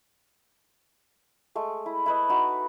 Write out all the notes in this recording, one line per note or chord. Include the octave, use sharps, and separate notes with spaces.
G#3 A3
E4
E4 B4 D#5
D#4 F#4 E5